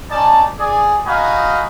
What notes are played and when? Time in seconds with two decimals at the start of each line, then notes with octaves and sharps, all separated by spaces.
0.10 C#4 D#4 D5 A5
0.58 G#4 D5
1.06 D#4 F#4 D#5 F5 G#5 B5